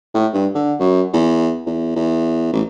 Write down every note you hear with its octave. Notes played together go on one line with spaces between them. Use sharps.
A2
G2
D3
F#2
E2
E2
E2
A1